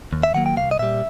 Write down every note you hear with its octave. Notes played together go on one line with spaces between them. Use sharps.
D#2
E5
D#3 F#3 A#3 F#5
G5
C2 F5
D#5
A#2 G3 E5